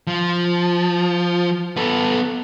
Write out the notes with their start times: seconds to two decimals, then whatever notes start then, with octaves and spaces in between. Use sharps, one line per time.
0.07 F3
1.77 B3 A4